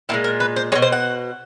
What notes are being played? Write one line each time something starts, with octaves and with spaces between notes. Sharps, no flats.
A#2 F3 G#3 E4
A#4
B4
C5
G#3 C#5
B2
C5
F#5